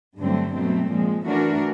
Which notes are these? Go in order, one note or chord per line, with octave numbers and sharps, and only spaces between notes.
G2 D3 F#3 A3 C4
B2 F#3 A3 C4
A#2 F3 G#3
E3 A3 D4 F#4 A#4